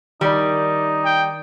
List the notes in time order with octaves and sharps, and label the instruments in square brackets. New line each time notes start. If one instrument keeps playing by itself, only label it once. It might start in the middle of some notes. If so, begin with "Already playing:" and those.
[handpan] D#3 D5 [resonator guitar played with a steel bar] G3 [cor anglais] D#4
[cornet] G5